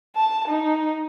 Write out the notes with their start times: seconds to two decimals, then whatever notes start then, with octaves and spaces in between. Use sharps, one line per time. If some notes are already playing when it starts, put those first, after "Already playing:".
0.16 A5
0.48 D#4